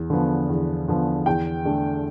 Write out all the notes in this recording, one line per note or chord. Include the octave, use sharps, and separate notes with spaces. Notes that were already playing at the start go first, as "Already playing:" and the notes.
Already playing: E2
D3 F3 B3
E2
D3 F3 B3
E2 G5
D3 A3 D4